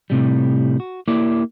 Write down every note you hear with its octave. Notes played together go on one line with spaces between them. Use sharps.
A2 C3 G3
F#4
A#3 E4 G4 D5